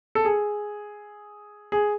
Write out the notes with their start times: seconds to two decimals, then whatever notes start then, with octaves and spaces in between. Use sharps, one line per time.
0.15 A4
0.25 G#4
1.72 G#4